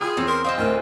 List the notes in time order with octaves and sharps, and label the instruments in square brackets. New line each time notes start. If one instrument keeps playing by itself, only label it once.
[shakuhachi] F4 [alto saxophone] G#4 [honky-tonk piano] G5 B5 D#6
[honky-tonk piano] E2 [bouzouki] C4 C#4
[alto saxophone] A#4 [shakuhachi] C6
[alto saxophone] C4 [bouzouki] C5 D#5 F5
[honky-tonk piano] D2 A2 F6 [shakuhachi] A#4